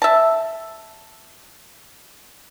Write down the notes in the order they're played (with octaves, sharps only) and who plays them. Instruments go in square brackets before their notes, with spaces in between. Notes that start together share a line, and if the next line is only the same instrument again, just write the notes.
[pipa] E5 A5